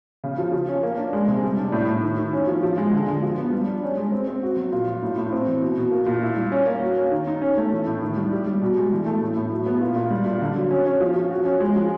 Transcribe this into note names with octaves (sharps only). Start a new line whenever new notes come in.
C#3
F3
F3
C#4
A#3
D4
G#3
C3
G3
D4
A2
A2
D#3
D#3
C#4
F3
F3
G#3
D3
D3
F3
B3
G3
D4
C#4
G#3
C4
C4
F#4
F#3
A#2
F#3
A2
A2
C4
E3
B2
B2
A#3
A#2
E4
G3
C#4
A#3
F#4
C#4
D#3
D#4
C#4
A3
E3
A2
D#3
G3
G4
G3
B2
G#3
E3
A3
A2
A2
F#3
B3
A#2
A#2
G3
A#2
D3
F#3
C#4
C#4
F3
F3
F#4
C#4
G#3
F3